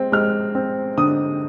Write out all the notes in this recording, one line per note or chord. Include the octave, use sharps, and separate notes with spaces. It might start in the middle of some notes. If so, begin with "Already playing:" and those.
Already playing: G#3 C4
G#3 F6
C4
D3 D#6